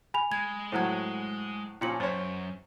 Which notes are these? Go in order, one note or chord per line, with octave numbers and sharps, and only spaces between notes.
G#5 B5 F7
G#3 G#6
A2 F#3 C5 F#5 G#6
A#2 F3 C#4 G5 C#7 F#7
F#2 C5 C#5 A6